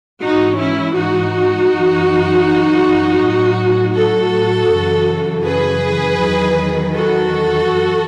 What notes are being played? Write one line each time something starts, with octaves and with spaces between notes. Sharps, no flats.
G#2 E3 D#4 F#4
C#4 E4
D#4 F#4
F#2 E3
A2 F#3
F#4 A4
F#2 C#3 E3
G#4 B4
E2 D#3 F#3
F#4 A4
F#2 E3